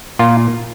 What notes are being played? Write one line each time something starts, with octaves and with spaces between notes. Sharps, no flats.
A#2 F4